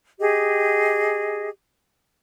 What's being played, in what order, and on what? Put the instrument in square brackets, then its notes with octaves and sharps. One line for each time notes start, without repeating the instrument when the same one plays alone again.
[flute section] G4 G#4 D#5